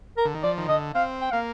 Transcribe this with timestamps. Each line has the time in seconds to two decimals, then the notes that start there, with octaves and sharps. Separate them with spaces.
0.17 A#4
0.25 D3
0.35 D#3
0.43 F3 D5
0.58 D#3
0.69 D3 D#5
0.95 C4 F5
1.21 G5
1.31 A#3 F5